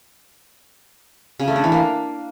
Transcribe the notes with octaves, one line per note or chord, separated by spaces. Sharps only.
C#3
A3
D4
E3
A#3